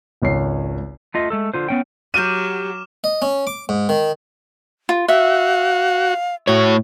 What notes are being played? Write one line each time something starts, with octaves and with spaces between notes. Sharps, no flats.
G#1 C#2 C#5 C7
A3 F4 D#5
G#3 A3 A4
D3 F4 C5
B3 C#4 G5
F#3 G4 F#5 D6 F6 D#7 E7
D#5
C#4
D6
G#2
D#3
F4
F#4 E5 F5
A2 F#4 C#5